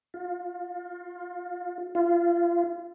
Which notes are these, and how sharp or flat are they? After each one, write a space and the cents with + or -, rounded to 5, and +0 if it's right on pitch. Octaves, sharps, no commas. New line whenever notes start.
F4 +25
F4 -25